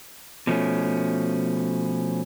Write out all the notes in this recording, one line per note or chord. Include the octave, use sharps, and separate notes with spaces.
B2 F3 A3 C#4